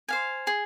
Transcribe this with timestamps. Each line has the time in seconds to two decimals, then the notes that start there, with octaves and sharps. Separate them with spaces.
0.08 C5 F5 G#5
0.47 G#4